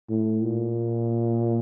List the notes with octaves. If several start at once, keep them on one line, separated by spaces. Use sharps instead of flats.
A2
A#2